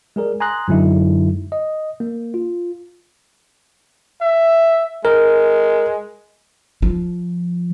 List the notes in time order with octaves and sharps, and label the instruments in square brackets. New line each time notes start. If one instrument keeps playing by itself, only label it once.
[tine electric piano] G#3 G#4 A#4 D5
G#5 A#5 C6 D#6 F#6 A#6
F#2 D3 F#3 G#3 D#4 E4
D#5
A#3
F4
[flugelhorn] E5
[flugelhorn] G#3 [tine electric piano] A#4
[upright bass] F3